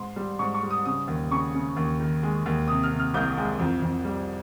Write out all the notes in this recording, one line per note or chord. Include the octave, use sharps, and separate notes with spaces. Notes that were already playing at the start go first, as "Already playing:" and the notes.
Already playing: G#2 C6
G3
G#2 C#6
C#6
G3
D#6
C#3 D#6
D#2
C#3 C#6
C#3
D#2
D#3
G#3
D#2
C3 D#6
F6
C3
F6
C2 G6
G#3
F2
F2
G3